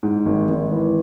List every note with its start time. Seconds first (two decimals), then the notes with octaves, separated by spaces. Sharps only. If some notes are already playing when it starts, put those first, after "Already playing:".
0.03 G#2
0.26 G#1
0.49 G#1
0.71 E3